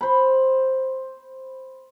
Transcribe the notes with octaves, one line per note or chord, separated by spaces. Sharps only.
C5 B5